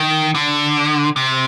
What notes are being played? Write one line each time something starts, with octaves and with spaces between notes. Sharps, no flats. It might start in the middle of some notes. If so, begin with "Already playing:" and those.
Already playing: D#3
D3
C3